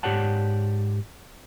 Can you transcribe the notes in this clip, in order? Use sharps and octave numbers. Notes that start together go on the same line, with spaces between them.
G#2 G4 C#5 D5 F#5 A5